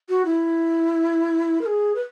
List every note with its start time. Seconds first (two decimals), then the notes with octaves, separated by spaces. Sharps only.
0.09 F#4
0.25 E4
1.61 A#4
1.66 G#4
1.95 B4